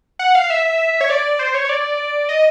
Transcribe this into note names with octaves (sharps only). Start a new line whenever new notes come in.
F#5
F5
E5
C#5
D5
C5
C#5
C#5
D5
D#5